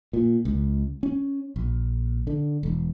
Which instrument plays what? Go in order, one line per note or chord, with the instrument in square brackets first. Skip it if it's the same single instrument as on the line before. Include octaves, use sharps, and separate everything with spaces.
[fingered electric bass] A#2
C#2
C#4
A#1
D3
E1